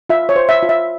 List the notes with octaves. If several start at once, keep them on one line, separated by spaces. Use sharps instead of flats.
F4 E5
C#5
C5
E5
F4
E5